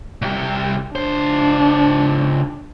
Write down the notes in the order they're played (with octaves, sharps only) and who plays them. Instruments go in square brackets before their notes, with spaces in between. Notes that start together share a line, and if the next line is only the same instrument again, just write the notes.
[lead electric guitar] C2 G4
[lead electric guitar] C#2 C5 [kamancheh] D4